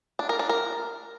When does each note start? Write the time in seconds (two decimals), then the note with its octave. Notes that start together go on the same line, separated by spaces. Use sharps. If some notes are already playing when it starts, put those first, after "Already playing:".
0.19 D4
0.29 A#4
0.39 D4
0.49 A#4